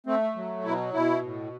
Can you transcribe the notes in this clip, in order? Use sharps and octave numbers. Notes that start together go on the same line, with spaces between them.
A3 C4
F#3
B2 E4
B2 E4
A2